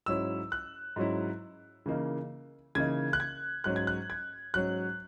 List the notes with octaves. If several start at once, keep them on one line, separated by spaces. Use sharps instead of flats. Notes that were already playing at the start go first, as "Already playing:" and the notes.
G#2 F#3 C#4 E4 E6
F#6
G#2 F#3 C#4 E4
C#3 E3 A#3 D#4
C#3 E3 A#3 D#4 G#6
F#6
G#6
G#2 F#3 C#4 F#6
G#6
F#6
G#6
G#2 F#3 C#4 F#6